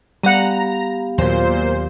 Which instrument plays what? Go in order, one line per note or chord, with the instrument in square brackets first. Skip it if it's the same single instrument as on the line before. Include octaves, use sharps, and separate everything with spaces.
[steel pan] G3 F#5 [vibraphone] B3 G4 F5 [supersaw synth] A#5
[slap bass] D#2 F#3 [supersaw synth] A#2 C5